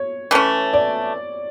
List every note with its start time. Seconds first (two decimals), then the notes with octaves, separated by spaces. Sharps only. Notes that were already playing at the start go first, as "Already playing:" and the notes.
Already playing: C#5
0.31 E3 A3 C#4
0.73 D5